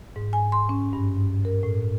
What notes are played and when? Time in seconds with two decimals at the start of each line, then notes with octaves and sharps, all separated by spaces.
0.16 G#2
0.33 G#5
0.52 C6
0.69 C#4
0.93 G2
1.45 A#4
1.63 A2